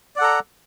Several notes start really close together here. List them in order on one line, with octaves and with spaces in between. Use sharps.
D5 F#5 A4 A#5